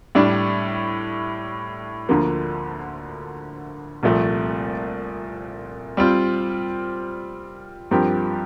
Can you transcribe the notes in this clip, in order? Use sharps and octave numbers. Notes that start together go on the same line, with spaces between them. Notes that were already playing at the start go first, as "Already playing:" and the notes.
A2 G3 D4
D2 D3 F3 A#3
C2 A#2 F3 A3
G3 C4 F4 C5
G2 F3 C4 G4 A#4